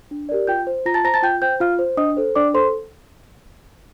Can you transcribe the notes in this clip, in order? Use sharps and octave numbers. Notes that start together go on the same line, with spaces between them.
D4
G4 A#4 D5
F4 G5 G6
C5
F4 A#5 A#6
A5 A6
C5 A#5 A#6
A5 A6
F4 G5 G6
C5 G5 G6
F4 F5 F6
C5
D4 D#5 D#6
A4 C5
D4 D5 D6
A4 C5 C6